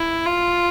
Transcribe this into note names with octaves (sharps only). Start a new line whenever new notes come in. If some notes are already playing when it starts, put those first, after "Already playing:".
Already playing: E4
F4